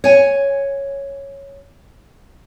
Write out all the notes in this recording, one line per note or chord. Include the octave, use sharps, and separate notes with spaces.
C#5 G#5